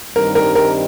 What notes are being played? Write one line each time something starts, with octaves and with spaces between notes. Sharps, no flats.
G2 D#3 G3 C4 D#4 A#4
A#4
A#4